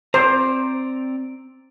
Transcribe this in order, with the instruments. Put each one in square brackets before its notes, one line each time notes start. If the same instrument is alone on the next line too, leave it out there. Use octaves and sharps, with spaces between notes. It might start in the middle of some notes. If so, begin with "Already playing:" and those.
[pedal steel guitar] C4 D5 A#5 [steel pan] C5